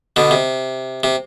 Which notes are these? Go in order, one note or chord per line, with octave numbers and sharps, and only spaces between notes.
B2 D3
C3
C3